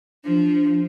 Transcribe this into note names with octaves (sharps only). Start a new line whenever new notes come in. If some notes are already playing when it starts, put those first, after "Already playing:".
F3 D4